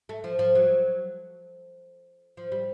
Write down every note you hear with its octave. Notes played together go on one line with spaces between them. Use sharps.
A3
F3
F3
F#3
F3
G3